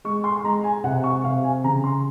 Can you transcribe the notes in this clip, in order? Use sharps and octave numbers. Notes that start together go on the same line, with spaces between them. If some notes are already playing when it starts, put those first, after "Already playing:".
G#3 C#6
C6
C6
G#3 A#5
G#5
C3 F#5
C#6
C3 F5
G#5
C#3 A#5
C6